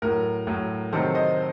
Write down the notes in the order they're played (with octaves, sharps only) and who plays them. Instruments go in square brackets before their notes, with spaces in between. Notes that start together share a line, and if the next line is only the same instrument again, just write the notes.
[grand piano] A2 F#3 A#4
A2 F#3
C3 D#3 F#3 A4 C5
C5 D#5